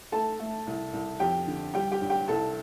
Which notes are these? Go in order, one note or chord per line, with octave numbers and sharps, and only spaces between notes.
A3 A4 A5
A3
C2
C2
F2 G4 G5
D3
G3 G4 G5
G4 G5
G2
G4 G5
C2 A4 A5